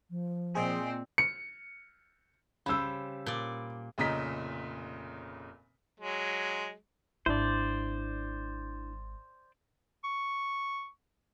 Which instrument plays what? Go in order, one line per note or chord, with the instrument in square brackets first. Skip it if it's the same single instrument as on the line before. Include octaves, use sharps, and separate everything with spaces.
[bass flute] F3
[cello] A#2 C4 [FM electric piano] G#4 C5 D#5
[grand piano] C#7
[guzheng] C#3 G3 C5 [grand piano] B5 E6
[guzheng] A#2 D5
[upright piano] F1 A#2 C#3 D#5 A#5 B6
[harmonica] F#3 G#3
[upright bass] G#1 [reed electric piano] D4 E4 [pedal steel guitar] C5 D5
[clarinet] C#6